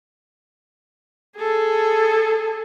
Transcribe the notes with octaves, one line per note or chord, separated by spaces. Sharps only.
G#4 A4